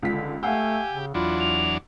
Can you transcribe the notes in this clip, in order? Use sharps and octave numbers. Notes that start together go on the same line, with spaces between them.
C#2 D3 F4 B6
A3 G4 F5 F#5 G#5 E6
C#3
E2 F#3 D4 F4 B5
F7